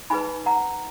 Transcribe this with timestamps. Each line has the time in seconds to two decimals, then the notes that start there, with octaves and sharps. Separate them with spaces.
0.10 D#4 G#4 B4 G#5 B5
0.46 F#5 A#5